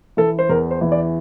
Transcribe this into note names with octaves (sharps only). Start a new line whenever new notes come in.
E3 A4
C5
E2 A#4
C5
E3
D5